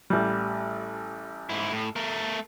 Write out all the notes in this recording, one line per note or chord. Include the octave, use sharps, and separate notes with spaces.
A1 G3
G#2 E4
A2
A3 A#4